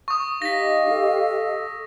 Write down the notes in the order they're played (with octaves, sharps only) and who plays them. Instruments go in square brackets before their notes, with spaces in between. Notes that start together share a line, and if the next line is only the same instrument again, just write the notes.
[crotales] C#6 D#6
[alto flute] D#4 [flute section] G4 D#5 F5 [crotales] A#6 B6
[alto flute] A4